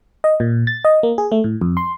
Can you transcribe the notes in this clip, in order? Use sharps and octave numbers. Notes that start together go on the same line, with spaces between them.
D#5
A#2
A6
D#5
A#3
G#4
A3
A2
F2
C6